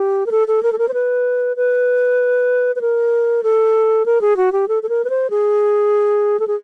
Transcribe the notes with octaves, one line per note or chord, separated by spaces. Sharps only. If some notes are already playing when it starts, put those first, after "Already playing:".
Already playing: G4
A#4
A4
A4
A#4
A4
A#4
C5
B4
B4
B4
A#4
A4
A#4
G#4
F#4
G4
A4
A4
A#4
B4
C5
G#4
A4
G#4